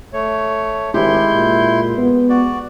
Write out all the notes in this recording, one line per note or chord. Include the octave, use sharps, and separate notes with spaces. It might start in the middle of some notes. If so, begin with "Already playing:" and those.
A3 C#5
G#1 G#3 E4 G4 C6 G6
A#2
B3
F#4 D5